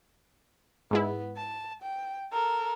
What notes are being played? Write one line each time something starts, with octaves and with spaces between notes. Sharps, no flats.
G#2 G#3 B3 E4
A5
G5
A4 A#4